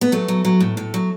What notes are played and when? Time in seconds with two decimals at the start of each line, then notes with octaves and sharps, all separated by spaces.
0.01 B3
0.12 F#3 A3
0.28 F#3
0.45 F#3
0.60 A2
0.77 A2
0.94 F#3